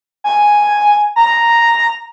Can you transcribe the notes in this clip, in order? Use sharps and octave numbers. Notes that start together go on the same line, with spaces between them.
G#5
A#5